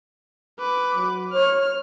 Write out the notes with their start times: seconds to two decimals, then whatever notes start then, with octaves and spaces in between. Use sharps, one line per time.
0.59 B4 D6
0.95 F#3
1.33 C#5 F6